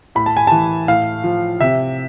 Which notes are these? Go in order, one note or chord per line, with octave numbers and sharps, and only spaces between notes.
A2 B5
A5
G#5
E3 A5
A2 F5
F3
C3 E5